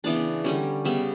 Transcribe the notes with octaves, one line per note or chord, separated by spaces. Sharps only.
C#3 E3 B3 D4 D5
D3 G3 C#4
C#3 G3 B3 E5